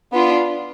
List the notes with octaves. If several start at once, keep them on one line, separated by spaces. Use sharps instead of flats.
B3 D4 F4